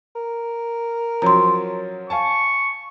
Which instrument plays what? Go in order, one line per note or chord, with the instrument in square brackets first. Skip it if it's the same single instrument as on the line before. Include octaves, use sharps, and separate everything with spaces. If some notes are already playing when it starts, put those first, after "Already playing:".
[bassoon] A#4
[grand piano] F3 F#3 C#4 [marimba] A#5 C6
[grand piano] F5 G#5 A5 [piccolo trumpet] C#6